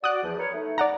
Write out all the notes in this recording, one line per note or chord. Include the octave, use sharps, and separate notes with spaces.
F#4 D5 D#6 F#6
E2 F3
A#4 B4 C#5
A3 D#4
D5 F#5 A#5